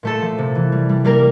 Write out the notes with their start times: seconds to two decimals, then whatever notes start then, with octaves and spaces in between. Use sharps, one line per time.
0.03 A#2 A3 A4
0.22 F3
0.38 C3
0.55 E3
0.72 G3
0.89 G3
1.04 G3 A#3 A#4